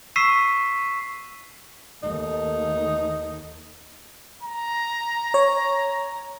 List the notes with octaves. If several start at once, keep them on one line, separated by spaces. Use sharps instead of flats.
C#6 E6 B6 C7 D#7 E7
D#2 A3 D#4
A#5
C#5